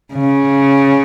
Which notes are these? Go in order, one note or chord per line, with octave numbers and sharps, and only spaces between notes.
C#3